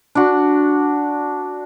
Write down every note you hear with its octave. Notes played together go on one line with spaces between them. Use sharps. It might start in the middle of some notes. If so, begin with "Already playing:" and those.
D4 F#4